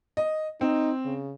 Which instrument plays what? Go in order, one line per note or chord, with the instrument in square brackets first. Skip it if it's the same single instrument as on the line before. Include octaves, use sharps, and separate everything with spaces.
[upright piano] D#5
[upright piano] C4 [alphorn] D#4
[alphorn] C#3